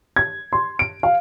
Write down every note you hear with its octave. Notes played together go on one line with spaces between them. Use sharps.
G#6
C6
D7
F5